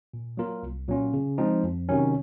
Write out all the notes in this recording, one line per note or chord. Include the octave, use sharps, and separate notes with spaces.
A#2
F#3 A#3 F4 A#4
C2
A#2 F#3 C#4 F4
C#3
F3 G#3 C4 D#4
F2
C3 D#3 F#3 C#4